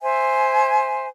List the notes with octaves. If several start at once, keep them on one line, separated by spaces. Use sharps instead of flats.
C5 E5 G#5